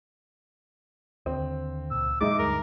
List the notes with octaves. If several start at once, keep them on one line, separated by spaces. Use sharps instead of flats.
D#2 D3 C4
C#2 A#2 E6
E2 A#2 F#3 G#3 D#4 E5 D6
D2 G2 A#4